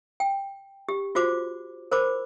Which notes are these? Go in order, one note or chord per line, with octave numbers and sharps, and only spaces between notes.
G5
G4
F4 F#4 C5 D6
A#4 C5 B5 D6